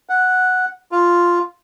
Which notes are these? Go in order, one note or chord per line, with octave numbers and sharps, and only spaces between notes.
F#5
F4